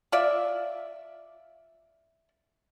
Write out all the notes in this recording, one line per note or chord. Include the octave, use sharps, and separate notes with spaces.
F4 D5 E5